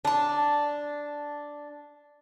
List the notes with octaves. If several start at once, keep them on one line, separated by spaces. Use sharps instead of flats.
D4 A5